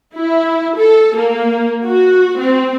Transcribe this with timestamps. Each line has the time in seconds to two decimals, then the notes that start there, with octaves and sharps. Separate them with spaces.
0.15 E4
0.77 A4
1.16 A#3
1.84 F#4
2.39 C4